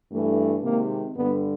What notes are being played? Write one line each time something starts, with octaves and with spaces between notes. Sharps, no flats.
G2 E3 A3
C3 D#3 G#3 A#3
G2 D3 G3 B3